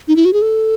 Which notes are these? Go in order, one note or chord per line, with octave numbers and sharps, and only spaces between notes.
D#4
E4
F#4
G#4
A4